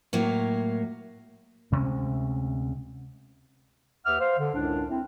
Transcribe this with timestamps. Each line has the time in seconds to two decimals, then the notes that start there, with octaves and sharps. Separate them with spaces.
0.13 A2 F#3 A#3
1.72 D2 C3 G#3 C#4
4.06 D#2 B4 E5 F#5 D6 F6
4.20 C5 F5
4.39 D3
4.55 C#2 F#2 A2 D4
4.90 C4 E4